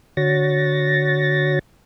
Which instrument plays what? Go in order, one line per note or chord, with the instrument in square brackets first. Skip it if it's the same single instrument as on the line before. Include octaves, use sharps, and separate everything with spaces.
[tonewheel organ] D3 F#4 C#5 A6 A#6